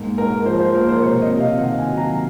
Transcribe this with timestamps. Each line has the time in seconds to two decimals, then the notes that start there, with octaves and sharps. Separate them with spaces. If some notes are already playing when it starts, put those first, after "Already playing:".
Already playing: G#2 A#3
0.18 G#2 A#4
0.46 F3 C5
0.60 C5
0.75 A#3 A#4
0.88 C5
1.03 C3 C#5
1.22 D#5
1.31 C3
1.41 F5
1.59 D#3 F#5
1.78 G#5
1.88 F#3
1.97 A#5